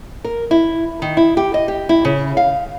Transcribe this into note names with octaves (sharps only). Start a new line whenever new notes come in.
A#4
E4
D#3
E4
G4
D#5
G4
E4
C#3
F5